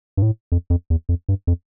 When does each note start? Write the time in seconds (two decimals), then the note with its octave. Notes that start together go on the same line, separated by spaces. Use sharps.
0.17 G2
0.22 A2
0.52 F2
0.70 F2
0.90 E2
1.09 F2
1.29 G2
1.47 F2